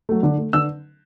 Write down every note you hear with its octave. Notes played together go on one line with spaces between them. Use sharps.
F#3 A3
D3
A3
D3 E6